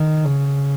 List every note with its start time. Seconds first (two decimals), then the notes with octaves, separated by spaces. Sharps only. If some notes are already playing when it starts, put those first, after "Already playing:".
Already playing: D#3
0.25 C#3